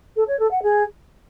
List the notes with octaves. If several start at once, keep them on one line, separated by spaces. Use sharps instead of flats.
A4
C#5
A4
F#5
G#4